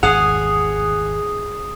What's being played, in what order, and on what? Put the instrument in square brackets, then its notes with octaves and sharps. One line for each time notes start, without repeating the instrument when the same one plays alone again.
[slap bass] G#1 E2 [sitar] G#4 [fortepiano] F#5 [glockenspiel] D#6 C7 F7